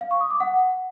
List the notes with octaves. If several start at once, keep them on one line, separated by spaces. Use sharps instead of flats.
F5
C#6
D#6
D6
F#5